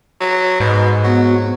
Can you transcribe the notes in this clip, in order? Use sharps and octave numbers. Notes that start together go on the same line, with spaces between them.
F#3
G#2 B2
F#3 B3 F#4